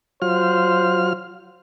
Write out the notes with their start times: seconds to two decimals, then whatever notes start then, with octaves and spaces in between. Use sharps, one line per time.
0.22 F#3 F4 C5 F6